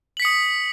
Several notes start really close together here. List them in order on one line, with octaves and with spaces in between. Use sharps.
F#7 B6 C#7 D#6